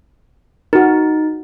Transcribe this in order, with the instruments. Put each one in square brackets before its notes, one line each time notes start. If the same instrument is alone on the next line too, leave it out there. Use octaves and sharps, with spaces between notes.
[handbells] D#4 [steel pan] F#4 A#4